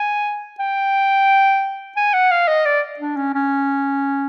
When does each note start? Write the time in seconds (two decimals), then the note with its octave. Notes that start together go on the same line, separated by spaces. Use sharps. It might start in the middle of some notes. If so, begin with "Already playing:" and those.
Already playing: G#5
0.59 G5
1.96 G#5
2.13 F#5
2.31 F5
2.48 D#5
2.65 D5
2.99 D4
3.16 C#4
3.34 C#4